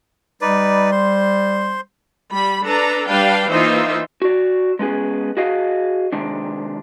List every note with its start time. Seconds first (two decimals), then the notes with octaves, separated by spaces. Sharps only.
0.41 G3 D#4 B4 D5
0.91 C5 C6
2.31 G3 B5
2.65 D4 A4 B4 A#5
3.09 G3 D4 B4 F5 G5
3.50 E3 A#3 D#4 F4 C5 E5
4.22 F#4 D5
4.79 G#3 B3 C#4 G#4
5.37 F#4 G#4 D#5 F5
6.12 C3 D#3 G#3 D4